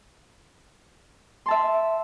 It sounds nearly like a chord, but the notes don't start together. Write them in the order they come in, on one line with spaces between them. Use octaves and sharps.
C6 A5 E5